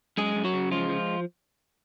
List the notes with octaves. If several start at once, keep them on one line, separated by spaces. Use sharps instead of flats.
F#2 G#3 G#4
F#2
F#3 F#4
C#3
F3 G#3 F4
F3